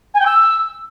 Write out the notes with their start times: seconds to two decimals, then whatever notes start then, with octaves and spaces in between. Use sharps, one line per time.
0.14 G#5
0.20 G5
0.25 E6